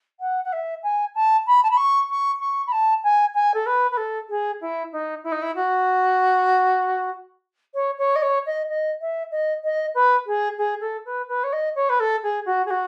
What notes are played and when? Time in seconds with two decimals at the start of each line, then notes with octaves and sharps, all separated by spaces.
0.20 F#5
0.44 F#5
0.52 E5
0.83 G#5
1.15 A5
1.47 B5
1.63 A5
1.71 B5
1.77 C#6
2.10 C#6
2.40 C#6
2.67 B5
2.72 A5
3.03 G#5
3.34 G#5
3.54 A4
3.66 B4
3.91 B4
3.97 A4
4.29 G#4
4.61 E4
4.93 D#4
5.24 E4
5.32 D#4
5.42 E4
5.55 F#4
7.74 C#5
7.98 C#5
8.16 D#5
8.22 C#5
8.46 D#5
8.69 D#5
9.01 E5
9.31 D#5
9.64 D#5
9.95 B4
10.27 G#4
10.58 G#4
10.81 A4
11.06 B4
11.28 B4
11.44 C#5
11.53 D#5
11.75 C#5
11.89 B4
12.00 A4
12.23 G#4
12.46 F#4
12.66 G#4
12.70 F#4